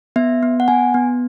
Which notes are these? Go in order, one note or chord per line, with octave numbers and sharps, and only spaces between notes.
B3 E5
B3
F#5
B3 G#5
B3